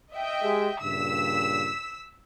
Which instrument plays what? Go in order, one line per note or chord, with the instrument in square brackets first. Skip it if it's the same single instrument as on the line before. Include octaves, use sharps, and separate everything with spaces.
[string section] D#5 E5 G5
[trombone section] G#3 G4 G#4
[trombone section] G2 A#2 C#3 [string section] E6 B6